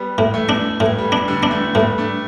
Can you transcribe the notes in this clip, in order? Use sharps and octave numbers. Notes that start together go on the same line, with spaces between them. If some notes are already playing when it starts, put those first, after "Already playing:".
Already playing: G3 B3
A2
E3 A3
D4
A2 E3
G3
E3
D4
D3 G3
D4
E3 A3
A2 G3 B3
A3 D4